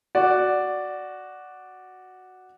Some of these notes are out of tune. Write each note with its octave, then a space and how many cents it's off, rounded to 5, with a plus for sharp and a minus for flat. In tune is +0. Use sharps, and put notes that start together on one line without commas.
F#4 +0 D5 +0